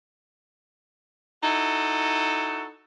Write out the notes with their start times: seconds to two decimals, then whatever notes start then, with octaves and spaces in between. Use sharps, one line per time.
1.43 D#4 E4 F#4 A4